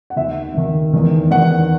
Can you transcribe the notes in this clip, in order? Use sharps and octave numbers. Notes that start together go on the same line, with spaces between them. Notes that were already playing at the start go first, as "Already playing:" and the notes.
F#5
D#2 D#3 E5
D#2 D#3
E2 D#3
E2 D#3 F#5